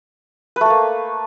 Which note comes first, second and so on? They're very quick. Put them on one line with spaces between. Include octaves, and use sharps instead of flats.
B4 A3 A4 A#3